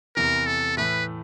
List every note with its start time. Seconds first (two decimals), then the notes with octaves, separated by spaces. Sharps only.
0.16 E2 C3 E3 A#4
0.46 A4
0.77 A2 E3 A3 B4